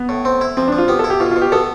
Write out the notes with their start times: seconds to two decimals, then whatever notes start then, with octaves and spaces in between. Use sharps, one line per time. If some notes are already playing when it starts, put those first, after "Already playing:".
Already playing: B3
0.09 A2
0.25 C4
0.41 E4
0.57 F3 C4
0.68 D4
0.72 F3
0.78 F4
0.88 B3 G4
0.99 A4
1.04 E4
1.10 G4
1.20 B2 F4
1.31 F4
1.36 B2
1.42 G4
1.52 B3 A4